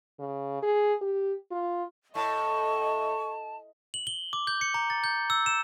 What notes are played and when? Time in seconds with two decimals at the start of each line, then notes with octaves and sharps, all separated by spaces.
0.20 C#3
0.62 G#4
1.01 G4
1.51 F4
2.15 A2 D#5 A5 C#6
3.94 F#7
4.07 G7
4.33 D6
4.47 G6
4.61 C#7
4.74 A#5
4.90 A6
5.04 G6
5.30 E6
5.46 E7